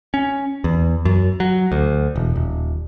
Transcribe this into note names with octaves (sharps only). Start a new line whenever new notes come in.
C#4
E2
F#2
F#3
D2
E1
D#1